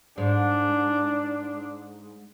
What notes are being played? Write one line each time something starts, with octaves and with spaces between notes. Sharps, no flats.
G#2 D4